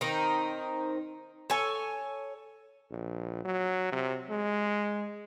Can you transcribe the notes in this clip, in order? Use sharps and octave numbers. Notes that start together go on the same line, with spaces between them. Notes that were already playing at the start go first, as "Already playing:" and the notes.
D#3 C4 D#4
A4 C#5 G#5
A#1
F#3
C3
G#3